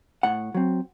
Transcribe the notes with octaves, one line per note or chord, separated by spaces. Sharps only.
A2 F#5
F#3 C4